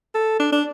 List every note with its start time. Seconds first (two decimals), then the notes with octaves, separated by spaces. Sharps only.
0.15 A4
0.40 D4
0.53 D4